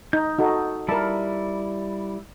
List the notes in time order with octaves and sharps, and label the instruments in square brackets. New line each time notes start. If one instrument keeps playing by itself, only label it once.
[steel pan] D#4 [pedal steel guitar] G6
[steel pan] D#4 F#4 A4
[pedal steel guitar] G3 E4 [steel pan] A#4 A5